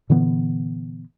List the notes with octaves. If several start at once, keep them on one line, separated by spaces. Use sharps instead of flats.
A#2 D3 E3 B3